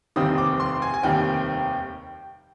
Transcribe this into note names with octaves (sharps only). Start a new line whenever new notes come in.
F1 D#2 D#3 G3 C4 D#6
D6
C6
G#5
G#5
F1 D#2 D#3 G3 C4 G5